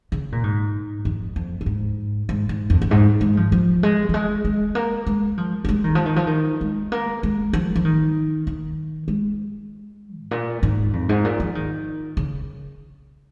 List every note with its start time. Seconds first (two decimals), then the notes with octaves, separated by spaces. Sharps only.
0.12 C#3
0.32 A#2
0.44 G#2
1.05 F2
1.36 F2
1.61 F2
1.66 G#2
2.29 G#2
2.49 G#2
2.70 F2
2.82 F2
2.91 G#2
3.21 G#3
3.37 F3
3.52 F3
3.83 G#3
4.09 F3
4.14 G#3
4.45 G#3
4.75 A#3
5.07 G#3
5.38 F3
5.65 F3
5.69 G#3
5.84 D#3
5.95 F3
6.06 D#3
6.16 F3
6.27 D#3
6.61 G#3
6.92 A#3
7.23 G#3
7.53 F3
7.76 F3
7.85 D#3
8.47 D#3
9.08 G#3
10.22 G#2
10.31 A#2
10.63 G#2
10.93 F2
11.09 G#2
11.25 A#2
11.40 F3
11.55 D#3
12.17 C#3